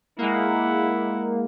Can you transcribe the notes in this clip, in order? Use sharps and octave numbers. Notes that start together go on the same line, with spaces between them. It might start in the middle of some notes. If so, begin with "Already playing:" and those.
G#3 A#3 E4 F#5